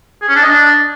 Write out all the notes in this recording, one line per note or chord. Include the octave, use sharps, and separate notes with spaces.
G#4
C#4
D4
D#5
D4